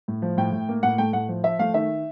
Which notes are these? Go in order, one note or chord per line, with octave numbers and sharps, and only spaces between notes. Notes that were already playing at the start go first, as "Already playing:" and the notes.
A2
F3
A2 G5
A2
A#3
A2 F#5
A3 G5
A2 F#5
F3
F3 E5
A3 F5
D#3 E5